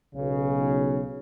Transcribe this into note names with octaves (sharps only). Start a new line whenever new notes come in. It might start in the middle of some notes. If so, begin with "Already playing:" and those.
B1 C#3